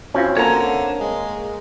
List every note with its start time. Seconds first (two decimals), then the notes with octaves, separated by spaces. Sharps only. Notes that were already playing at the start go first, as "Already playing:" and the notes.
0.14 E3 C4 C#4 F4 F#4
0.37 D3 A#3 C#5 A#5
1.01 G#3